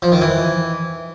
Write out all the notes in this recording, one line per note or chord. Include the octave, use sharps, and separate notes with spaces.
F3
D#3
E3